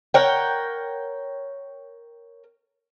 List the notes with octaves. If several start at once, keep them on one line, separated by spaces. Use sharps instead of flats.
A#4 C#5 F#5 G5